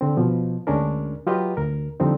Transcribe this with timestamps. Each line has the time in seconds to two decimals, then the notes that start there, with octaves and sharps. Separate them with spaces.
0.01 D3 C4
0.17 B2 F3
0.67 D2 G#3 C#4 D4 A#4
1.27 F#3 F4 G4 B4 D#5
1.57 D2 A#4
2.00 F2 D3 F3 G3 C4 D#4